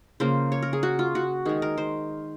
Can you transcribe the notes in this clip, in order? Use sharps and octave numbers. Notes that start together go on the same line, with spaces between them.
C#3 F3 A#3 C5
C#5
A#4
G#4
F#4
F4
F#4
D#3 G#3 G#4
A#4
C5